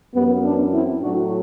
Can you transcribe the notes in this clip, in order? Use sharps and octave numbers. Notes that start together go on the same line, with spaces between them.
F#2 E3 G3 B3
B3 D4
C4 E4
A2 F#3 D4 F#4